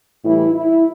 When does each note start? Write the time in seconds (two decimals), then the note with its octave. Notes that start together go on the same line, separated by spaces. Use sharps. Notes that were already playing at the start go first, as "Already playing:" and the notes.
0.24 A2 E3 G3 E4
0.54 E4